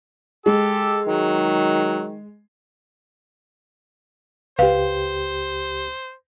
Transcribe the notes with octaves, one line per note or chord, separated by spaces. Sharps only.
G#3 G4 A4 E6
D#3 F#3
C#2 G4 B4 C5 F5